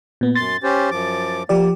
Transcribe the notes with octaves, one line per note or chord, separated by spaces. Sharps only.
A#2 B3
F#2 C6 A6
C#4 G4 C5
F#2 F3 D6
F3 A#3 G4 D5